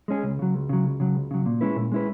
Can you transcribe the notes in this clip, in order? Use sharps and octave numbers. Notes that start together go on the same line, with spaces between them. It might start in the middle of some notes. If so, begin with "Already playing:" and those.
G#3 C#4 G#4
C#2
C#3 F#3
C#2
C#3 F#3
C#2
C#3 F#3
C#2
C#3 F#3
A#2
G#3 C#4 E4 B4
A#2
G#3 C#4 E4 B4